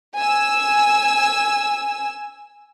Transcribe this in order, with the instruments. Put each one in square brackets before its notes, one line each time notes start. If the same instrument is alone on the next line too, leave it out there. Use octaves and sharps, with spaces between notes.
[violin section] G#5 E6